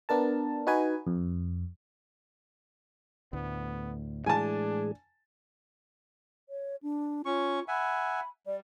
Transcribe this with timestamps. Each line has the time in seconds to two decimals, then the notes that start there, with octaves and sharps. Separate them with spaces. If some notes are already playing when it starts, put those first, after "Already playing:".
0.09 B3 D4 A#4 A5
0.67 D#4 F#4 B4 G#5
1.07 F2
3.33 D2 A2 B3
4.26 A2 E3 G#3 D4 G#4 G#5 A5
6.49 C#5
6.83 D4
7.25 C#4 F4 C#6
7.68 E5 F#5 G#5 B5
8.47 G3 D5